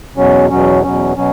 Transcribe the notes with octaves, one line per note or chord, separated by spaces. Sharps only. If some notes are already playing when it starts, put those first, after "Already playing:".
E2 B2 F#3 C#4
E2 B2 F#3 C#4
E2 B2 F#3 C#4
B2 F#3 C#4